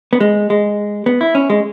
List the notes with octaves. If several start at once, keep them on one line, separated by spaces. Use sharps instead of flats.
B3
G#3
G#3
B3
E4
C#4
G#3